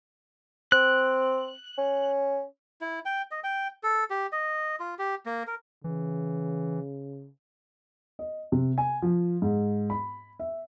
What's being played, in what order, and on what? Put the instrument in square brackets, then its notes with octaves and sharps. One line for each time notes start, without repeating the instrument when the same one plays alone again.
[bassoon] C4 [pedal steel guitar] F#6
[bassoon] C#4
[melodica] E4
G5
D#5
G5
A4
G4
D#5
F4
G4
A#3
A#4
[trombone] C#3 [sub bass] E3
[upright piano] D#5
C3
G#5
F3
G#2
B5
E5